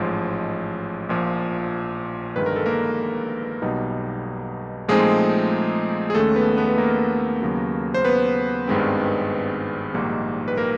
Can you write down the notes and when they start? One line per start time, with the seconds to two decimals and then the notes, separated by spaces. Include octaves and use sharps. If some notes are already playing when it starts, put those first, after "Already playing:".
Already playing: A1 G#2 F3 G#3
1.09 A#1 A#2 F3
2.36 G1 G2 D#3 G#3 B4
2.46 A#4
2.56 A4
2.66 A#3 A#4
3.62 B1 B2 G3 B3 D#4
4.88 A#2 F3 G#3 A3 C4 D#4 G#4
6.10 G#4
6.15 D#2 D#3 G#3 A3 C#4 A4
6.36 B3 B4
6.56 B3 B4
6.69 B4
6.78 A#3 A#4
7.41 D#2 C#3 F#3 B3
7.94 C5
8.05 B3 B4
8.68 G#1 G2 D#3 G#3 C4
9.94 A#1 G#2 D#3 G3 A#3
10.48 B4
10.57 A#3 A#4